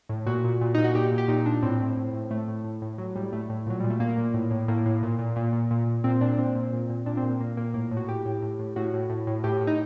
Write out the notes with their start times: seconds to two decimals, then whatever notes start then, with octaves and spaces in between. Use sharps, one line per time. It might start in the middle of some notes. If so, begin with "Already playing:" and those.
0.09 A2
0.27 A#2 F#4
0.44 A#2
0.61 A#2
0.74 A#2 D#4
0.84 F#4
0.95 A#2 G4
1.12 A#2
1.18 G4
1.28 A#2 D#4
1.46 A#2 D4
1.63 A2 C4
1.80 A2
1.97 A2
2.13 A2
2.30 A2 A3
2.48 A2
2.64 A2
2.82 A2
2.98 A2 F#3
3.16 A2 G3
3.33 A2 A3
3.50 A2
3.67 A#2 F#3
3.80 A#2 G3
3.90 A3
4.00 A#2 A#3
4.18 A#2
4.34 A2
4.51 A2
4.68 A2 A#3
4.86 A2
5.03 A#2
5.19 A#2
5.36 A#2
5.53 A#2
5.71 A#2
5.87 A#2
6.04 A#2 C4
6.21 A#2 D4
6.38 A#2 C4
6.55 A#2
6.73 A#2
6.90 A#2
7.06 A#2 D4
7.17 C4
7.23 A#2
7.29 A#3
7.40 A#2 A#3
7.57 A#2 A#3
7.74 A2 A#3
7.91 A2
7.97 F#4
8.09 A2 G4
8.25 A2
8.42 A2
8.59 A2
8.76 A2 F#4
8.94 A2
9.10 A2
9.27 A2
9.44 A2 G4
9.61 A2
9.67 D#4